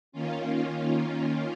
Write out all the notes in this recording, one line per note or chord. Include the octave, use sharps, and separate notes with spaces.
D#3 A#3 C#4 F4